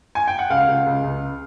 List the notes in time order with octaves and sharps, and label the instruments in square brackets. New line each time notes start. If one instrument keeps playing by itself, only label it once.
[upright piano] G#5
G5
F#5
C#2 F5
C#2
C#2
C#2